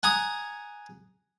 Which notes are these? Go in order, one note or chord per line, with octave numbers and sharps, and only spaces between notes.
F#5 G#5 A#5 D#6